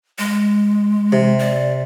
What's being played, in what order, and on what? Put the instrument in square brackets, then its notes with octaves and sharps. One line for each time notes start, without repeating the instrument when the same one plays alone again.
[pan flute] G#3
[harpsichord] C3
[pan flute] D5